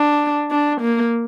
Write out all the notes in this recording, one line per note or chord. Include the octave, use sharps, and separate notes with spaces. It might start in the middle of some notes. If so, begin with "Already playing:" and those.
Already playing: D4
D4
A#3